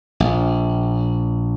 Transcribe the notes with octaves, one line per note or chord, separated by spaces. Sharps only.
A#1